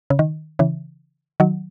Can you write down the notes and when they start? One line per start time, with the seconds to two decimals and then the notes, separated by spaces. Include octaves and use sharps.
0.10 C#3
0.19 D#3
0.59 C#3 E3
1.40 D#3 F#3